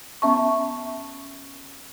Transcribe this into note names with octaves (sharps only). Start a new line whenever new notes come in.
B3 C#4 E5 A5 C#6